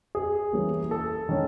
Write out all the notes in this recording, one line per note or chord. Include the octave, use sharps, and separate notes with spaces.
G#4
E3 G3 A#3 C#4
A4
D#3 G#3 C#4